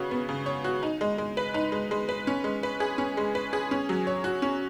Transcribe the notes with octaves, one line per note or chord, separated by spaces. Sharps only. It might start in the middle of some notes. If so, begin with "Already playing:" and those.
Already playing: C#3 B3 F#4 C#5
B3
C#3
C#5
F#4
D#4
G#3
G#3
B4
D#4
G#3
G#3
B4
C#4
G#3
B4
G#4
C#4
G#3
B4
G#4
C#4
F#3
C#5
F#4
C#4